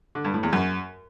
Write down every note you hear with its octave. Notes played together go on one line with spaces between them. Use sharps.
D3
G2
A2
E2
F#2